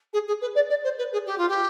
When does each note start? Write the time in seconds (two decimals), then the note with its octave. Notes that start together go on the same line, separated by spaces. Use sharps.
0.14 G#4
0.28 G#4
0.42 B4
0.55 D5
0.70 D5
0.84 C5
0.98 B4
1.13 G#4
1.26 G4
1.38 F4
1.49 G4